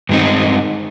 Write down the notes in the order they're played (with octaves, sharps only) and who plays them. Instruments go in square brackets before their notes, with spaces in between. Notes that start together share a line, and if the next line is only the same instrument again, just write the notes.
[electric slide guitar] G2 D#3 G#3 C4 D#4